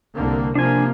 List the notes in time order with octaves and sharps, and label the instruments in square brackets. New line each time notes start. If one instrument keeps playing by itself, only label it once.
[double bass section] C2 D3 A#3
[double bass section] C3 F3 A#3 [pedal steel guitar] D4 G#5